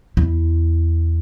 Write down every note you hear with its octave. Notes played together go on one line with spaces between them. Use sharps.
E2 E4